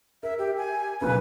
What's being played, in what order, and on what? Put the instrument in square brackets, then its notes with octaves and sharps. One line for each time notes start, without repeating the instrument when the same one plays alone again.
[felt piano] A#4 [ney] E5
[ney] G4
G#5
[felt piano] B1 A#2 C#3 [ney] B4